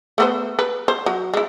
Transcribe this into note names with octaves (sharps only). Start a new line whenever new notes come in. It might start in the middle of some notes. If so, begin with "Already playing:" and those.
A3 B3 C5
B4
C5
F#3
G#3 E4